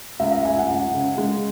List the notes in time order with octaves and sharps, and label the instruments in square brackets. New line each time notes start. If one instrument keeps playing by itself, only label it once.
[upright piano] C#2 E5
E5
C#2 G#5
F#5
C#2 F#5
C#3
G#3